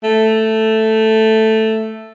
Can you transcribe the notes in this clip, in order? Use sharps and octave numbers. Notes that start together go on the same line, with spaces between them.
A3